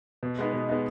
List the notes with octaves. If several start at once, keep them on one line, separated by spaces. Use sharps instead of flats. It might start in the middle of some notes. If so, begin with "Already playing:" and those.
B2
G#3 B3 D#4
B2
G#3 B3 D#4